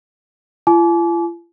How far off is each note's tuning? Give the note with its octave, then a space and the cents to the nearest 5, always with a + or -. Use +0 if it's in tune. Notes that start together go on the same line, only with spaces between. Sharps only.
F4 -45 G#5 +45 D6 -25